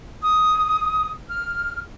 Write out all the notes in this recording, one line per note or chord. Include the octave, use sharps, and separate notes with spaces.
D#6
F6